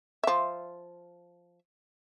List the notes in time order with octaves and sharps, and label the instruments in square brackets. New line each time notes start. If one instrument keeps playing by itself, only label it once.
[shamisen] F3 E5